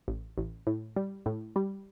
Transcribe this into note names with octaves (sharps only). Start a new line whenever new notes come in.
A1
A1
A2
G3
A2
G3